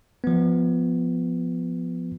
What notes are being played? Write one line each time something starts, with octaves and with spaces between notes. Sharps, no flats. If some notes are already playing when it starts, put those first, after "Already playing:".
F3 B3